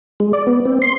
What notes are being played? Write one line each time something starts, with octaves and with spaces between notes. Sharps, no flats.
G#3
D5
B3
C4
C6